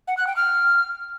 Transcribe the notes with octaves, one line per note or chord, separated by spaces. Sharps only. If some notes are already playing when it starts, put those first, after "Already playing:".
F#5
F#6
G5
F6